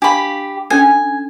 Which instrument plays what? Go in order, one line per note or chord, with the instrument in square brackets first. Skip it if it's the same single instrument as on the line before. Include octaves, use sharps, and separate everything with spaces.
[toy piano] D4 F5 C#6 [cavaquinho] G4 B5
[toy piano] C#4 D4 A4 [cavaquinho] G#5